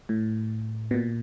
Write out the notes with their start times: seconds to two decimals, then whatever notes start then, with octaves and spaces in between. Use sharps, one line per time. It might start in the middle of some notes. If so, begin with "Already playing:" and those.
0.09 A2
0.91 B2
0.94 A#2